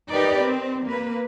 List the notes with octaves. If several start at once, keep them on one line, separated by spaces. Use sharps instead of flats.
D#4 G4 A#4 B4 D5
C4
A#3 B4